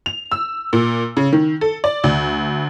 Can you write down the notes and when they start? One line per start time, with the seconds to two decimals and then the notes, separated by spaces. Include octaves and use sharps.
0.06 F7
0.31 E6
0.73 A#2
1.17 C#3
1.33 D#3
1.61 A4
1.84 D5
2.04 D2